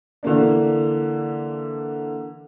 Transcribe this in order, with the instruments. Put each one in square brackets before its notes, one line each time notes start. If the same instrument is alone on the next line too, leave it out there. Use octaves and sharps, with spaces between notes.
[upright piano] D3 E3 A#3 D4